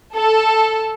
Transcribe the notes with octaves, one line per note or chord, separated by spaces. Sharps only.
A4